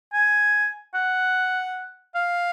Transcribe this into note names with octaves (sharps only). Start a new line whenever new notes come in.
G#5
F#5
F5